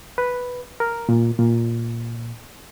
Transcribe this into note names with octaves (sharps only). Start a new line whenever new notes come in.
B4
A#4
A#2
A#2